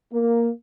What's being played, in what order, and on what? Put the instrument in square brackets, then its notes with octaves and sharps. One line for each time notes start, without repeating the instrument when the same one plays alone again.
[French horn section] A#3